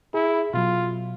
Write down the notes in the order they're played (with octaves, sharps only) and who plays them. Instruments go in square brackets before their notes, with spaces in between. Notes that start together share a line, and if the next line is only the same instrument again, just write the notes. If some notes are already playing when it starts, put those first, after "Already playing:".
[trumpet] E4 [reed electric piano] G#4
[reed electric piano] B2 F#3 [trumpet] F4